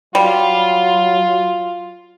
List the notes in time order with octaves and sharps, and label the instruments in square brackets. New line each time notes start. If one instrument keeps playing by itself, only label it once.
[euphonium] F#3 [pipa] G3 [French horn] F4